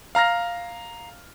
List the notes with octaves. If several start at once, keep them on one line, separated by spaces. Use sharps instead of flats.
F5 A#5 F6 A#6